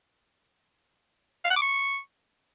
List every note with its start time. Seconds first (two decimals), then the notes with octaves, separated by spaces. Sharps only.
1.45 F5
1.51 F#5
1.56 D6
1.62 C#6